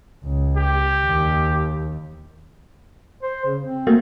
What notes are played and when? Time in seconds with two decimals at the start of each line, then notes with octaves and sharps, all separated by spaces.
0.24 C#2
0.57 G4
1.06 D#2
3.23 C5
3.45 C#3
3.61 C4
3.87 A3 A#3 F#4